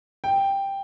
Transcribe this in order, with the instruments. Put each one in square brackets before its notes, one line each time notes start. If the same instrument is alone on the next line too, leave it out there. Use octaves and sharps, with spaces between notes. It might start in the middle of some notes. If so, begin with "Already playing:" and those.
[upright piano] G5